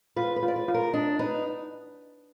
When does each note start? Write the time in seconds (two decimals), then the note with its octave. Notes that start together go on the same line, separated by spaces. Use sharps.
0.16 F4 B4
0.36 B4
0.43 F4
0.48 D5
0.56 B4
0.68 F4
0.74 A#4
0.94 D4 D#5
1.19 D#4 B4